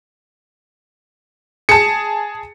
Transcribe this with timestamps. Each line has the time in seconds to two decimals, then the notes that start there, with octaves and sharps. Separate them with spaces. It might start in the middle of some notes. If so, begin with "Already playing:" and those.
1.69 G#4 A5 C#7